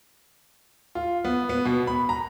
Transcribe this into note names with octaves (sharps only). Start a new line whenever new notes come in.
F4
B3
B3
B2
B5
A#5